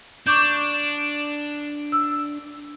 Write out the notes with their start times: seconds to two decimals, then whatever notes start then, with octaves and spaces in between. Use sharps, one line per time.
0.27 D4 C#6 D6 G6
1.92 E6